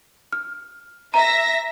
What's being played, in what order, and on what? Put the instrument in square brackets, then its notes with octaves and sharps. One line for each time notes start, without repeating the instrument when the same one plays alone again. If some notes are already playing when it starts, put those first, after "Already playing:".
[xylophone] F6
[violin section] E5 A#6 [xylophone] A#5